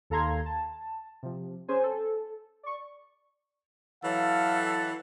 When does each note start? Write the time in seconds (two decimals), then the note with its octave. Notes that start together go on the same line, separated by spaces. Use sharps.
0.10 D#2 A4 F5 A#5 C6 G#6
0.46 A5
1.23 C3 F3
1.68 C#4 G#4 C5 G#5
1.83 A4
2.63 D5 C#6
4.04 E3 F#3 A4 F5